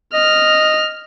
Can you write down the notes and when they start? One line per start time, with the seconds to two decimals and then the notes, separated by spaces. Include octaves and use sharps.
0.14 D#5 F6